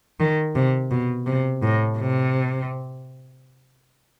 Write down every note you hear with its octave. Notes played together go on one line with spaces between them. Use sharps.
D#3
C3
B2
C3
A2
C3